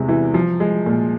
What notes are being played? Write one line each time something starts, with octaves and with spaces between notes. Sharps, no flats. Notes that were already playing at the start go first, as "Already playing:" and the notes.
Already playing: E2 C3 G#3
E3
F3
G#3
A#2